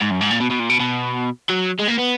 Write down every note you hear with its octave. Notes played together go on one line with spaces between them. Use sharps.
G#2
F#2
G#2
A#2
B2
B2
A#2
B2
B2
F#3
G#3
A#3
B3